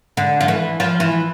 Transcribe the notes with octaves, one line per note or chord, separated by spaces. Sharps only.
D3
F3
E3
F3
E3